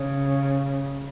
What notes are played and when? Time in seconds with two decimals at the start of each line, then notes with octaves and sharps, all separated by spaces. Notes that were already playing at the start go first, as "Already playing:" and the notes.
Already playing: C#3